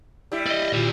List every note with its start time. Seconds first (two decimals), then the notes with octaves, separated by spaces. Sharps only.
0.32 G3 E4
0.47 D5 D#5
0.73 A#2 F#4 D5